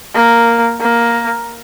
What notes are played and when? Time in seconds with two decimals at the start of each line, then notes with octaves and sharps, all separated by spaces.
0.15 A#3
0.80 A#3